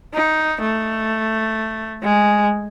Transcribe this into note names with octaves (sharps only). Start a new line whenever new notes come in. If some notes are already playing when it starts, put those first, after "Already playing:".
D#4
A3
G#3